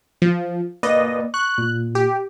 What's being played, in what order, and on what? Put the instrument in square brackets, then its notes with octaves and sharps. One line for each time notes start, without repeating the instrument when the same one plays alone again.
[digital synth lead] F3
[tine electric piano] A#3 B4 D5 [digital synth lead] D#5
[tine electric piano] C#6 [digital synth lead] F#6
[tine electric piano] A#2
[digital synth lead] G4